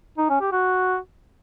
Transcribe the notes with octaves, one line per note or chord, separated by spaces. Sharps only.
D#4
C#4
G4
F#4